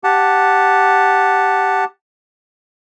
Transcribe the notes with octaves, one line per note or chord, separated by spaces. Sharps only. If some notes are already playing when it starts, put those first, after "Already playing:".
G4 F#5 A5